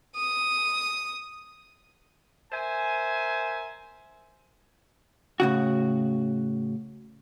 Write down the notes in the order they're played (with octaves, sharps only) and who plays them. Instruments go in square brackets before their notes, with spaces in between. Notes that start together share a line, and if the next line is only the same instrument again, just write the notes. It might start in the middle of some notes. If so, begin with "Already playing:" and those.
[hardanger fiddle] D#6
[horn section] A#4 C5 E5 G#5
[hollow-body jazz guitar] A2 C#3 F#4